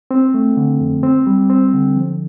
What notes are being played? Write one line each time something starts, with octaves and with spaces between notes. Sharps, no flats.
C4
A3
D3
F2
C4
G3
C4
D3
F3